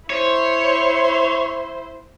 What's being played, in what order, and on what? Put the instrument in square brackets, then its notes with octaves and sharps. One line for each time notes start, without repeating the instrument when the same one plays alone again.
[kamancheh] E4 C5 [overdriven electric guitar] C#5